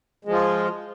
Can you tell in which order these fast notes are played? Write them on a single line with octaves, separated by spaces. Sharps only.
G#3 F3 F4